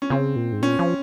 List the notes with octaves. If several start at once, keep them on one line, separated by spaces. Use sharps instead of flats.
C#4
C#3 C4
A#2
G#2
A#2 C#4
F3